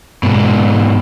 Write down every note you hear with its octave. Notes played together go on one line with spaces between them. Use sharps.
G#2 B2